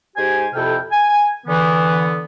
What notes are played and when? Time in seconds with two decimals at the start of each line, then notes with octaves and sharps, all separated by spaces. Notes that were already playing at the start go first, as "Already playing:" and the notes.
0.16 G#2 G4 C5 G#5
0.54 F2 C3 E4 A4 G5 F6
0.92 G#5
1.46 D3 E3 B3